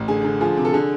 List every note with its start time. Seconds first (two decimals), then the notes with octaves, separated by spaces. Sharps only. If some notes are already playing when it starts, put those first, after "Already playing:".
Already playing: A1
0.08 D3 G#4
0.25 D3
0.41 F3 G#4
0.57 C3
0.65 A4
0.73 D3 G#4